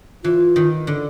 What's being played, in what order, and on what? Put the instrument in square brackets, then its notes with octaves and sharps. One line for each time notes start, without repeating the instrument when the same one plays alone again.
[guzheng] E3 [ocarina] F4
[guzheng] D#3
D3